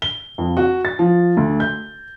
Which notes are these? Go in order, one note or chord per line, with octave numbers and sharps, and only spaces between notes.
G7
F2
F#4
A6
F3
D2
G6